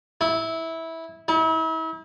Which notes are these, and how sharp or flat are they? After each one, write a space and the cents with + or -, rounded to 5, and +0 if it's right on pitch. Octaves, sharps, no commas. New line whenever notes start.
E4 -15
E4 -40